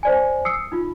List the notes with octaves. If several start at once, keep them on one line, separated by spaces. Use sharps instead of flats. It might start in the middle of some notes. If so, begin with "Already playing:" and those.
C5 D5 G#5
D#6 E6 C7 C#7
D#4 F4